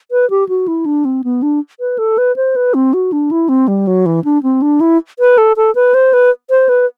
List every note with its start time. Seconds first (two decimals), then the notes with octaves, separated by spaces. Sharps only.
0.11 B4
0.30 G4
0.49 F#4
0.68 E4
0.86 D4
1.05 C4
1.24 B3
1.42 D4
1.80 B4
1.98 A4
2.18 B4
2.36 C5
2.56 B4
2.74 C4
2.94 F#4
3.12 D4
3.31 E4
3.49 C4
3.68 G3
3.87 F#3
4.06 E3
4.24 D4
4.43 C4
4.62 D4
4.81 E4
5.19 B4
5.38 A4
5.57 A4
5.75 B4
5.94 C5
6.13 B4
6.50 C5
6.69 B4